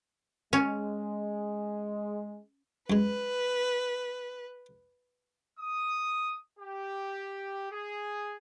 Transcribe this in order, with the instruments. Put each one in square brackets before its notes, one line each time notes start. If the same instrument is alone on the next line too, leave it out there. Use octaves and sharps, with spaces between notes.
[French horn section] G#3 [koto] C#4
[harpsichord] F#2 G#3 [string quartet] B4
[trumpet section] D#6
G4
G#4